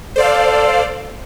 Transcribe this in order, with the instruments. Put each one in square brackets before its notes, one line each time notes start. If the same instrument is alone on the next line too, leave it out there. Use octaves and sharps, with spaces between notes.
[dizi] A4 [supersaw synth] C5 D5 F5